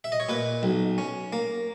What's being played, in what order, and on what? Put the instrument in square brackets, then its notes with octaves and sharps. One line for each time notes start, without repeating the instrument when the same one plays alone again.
[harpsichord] E5
D#5
C#5
A#2 B4
B1
C#4
A#3